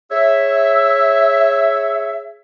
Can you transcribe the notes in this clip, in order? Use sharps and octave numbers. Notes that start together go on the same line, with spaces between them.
G#4 C#5 E5